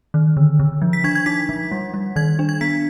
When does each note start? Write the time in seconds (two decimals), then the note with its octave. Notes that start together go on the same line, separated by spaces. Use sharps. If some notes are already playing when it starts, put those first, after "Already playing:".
0.14 D#3
0.37 D3
0.60 D3
0.82 F3
0.93 B6
1.04 D4 G#6
1.15 G#6
1.26 D#4 B6
1.49 F3
1.72 G3
1.94 G3
2.16 D#3 G#6
2.39 D4
2.49 G#6
2.61 B3 B6